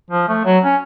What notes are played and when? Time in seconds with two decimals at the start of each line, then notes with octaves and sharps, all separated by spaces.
0.10 F3
0.29 A3
0.45 F#3
0.64 C#4